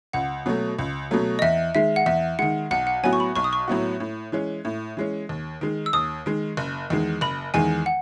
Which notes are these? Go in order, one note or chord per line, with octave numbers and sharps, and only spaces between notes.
C#2 F#5
B2 F#3 A3
C#2
B2 F#3 A3
D#5
E2 E5
D#3 G#3 E5
F#5
E2 E5
D#3 G#3 F#5
B1 F#5
F#5
A2 F#3 B3 F#4 G#5
C#6
B5
B1 C#6
D#6
C#6
A2 F#3 B3 F#4
A2
E3 G#3 C#4
A2
E3 G#3 C#4
D#2
D#3 G#3
E6
D#2 D#6
D#3 G#3
F#1
E2 D#3 G#3
F#1 B5
E2 D#3 G#3 G#5
F#5